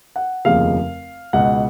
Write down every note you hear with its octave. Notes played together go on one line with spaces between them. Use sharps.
F#5
F1 D#2 C#3 F3 F5
C#2 B2 F#5